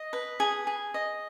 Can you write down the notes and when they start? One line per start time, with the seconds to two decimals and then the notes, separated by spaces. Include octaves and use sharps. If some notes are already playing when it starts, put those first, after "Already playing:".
Already playing: D#5
0.13 B4
0.40 G#4
0.67 G#4
0.94 D#5